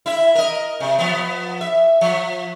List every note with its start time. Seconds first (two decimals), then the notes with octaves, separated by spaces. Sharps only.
0.06 E4 E5
0.35 A#4 D#5
0.80 C3
0.99 F3 B3
1.61 E5
2.01 F3